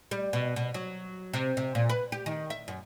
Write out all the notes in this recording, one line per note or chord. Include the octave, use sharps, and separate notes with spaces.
G3
B2
B2
F#3
C3
C3
A#2
B4
G4
D#3
E5
F#2